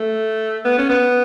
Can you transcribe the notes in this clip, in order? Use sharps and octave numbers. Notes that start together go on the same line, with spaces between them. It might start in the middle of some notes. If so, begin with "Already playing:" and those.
Already playing: A3
B3
C#4
B3